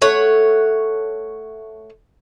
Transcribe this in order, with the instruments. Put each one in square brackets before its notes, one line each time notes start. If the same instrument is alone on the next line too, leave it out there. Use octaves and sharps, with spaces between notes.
[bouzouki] A3 C#5 F#5